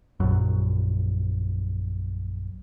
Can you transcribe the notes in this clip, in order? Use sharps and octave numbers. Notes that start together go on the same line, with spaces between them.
A#1 F#2